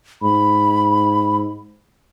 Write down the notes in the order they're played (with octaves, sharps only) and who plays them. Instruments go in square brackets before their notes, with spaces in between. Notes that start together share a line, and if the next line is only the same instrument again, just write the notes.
[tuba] G#2 [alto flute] B5